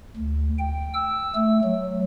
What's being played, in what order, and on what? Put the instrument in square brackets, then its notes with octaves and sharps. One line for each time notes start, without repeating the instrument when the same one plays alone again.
[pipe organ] D2
G5
E6
A3
F#3